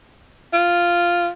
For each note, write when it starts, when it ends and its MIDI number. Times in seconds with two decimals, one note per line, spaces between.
0.53 1.30 65